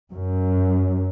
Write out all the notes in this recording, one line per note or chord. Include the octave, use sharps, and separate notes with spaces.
F#2